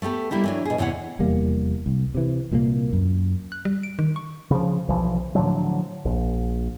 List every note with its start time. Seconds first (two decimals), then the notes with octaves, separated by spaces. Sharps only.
0.02 A3 B3 G4 A4
0.31 G3 A#3 E4 G4
0.44 E3 F#3 D4
0.65 B2 G#4
0.78 E2 C3 E3 C#5 F#5
1.19 F1 E2 G3 A#3
1.86 C2
2.15 C3 E3
2.51 C2 A#2 F3 A#3
2.93 F#2
3.52 F#6
3.65 G3
3.83 D7
3.99 D#3
4.16 C#6
4.51 C#3 F3
4.88 B1 E3 F3
5.35 A2 D3 F3 F#3
6.05 A#1